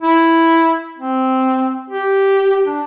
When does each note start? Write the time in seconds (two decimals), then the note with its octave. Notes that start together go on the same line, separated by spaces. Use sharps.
0.02 E4
0.98 C4
1.90 G4
2.66 D4